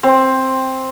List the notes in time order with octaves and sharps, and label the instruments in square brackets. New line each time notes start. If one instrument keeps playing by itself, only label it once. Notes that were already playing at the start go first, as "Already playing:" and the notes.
[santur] C4